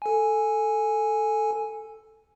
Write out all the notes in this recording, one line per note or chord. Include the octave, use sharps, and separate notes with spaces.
A4 G#5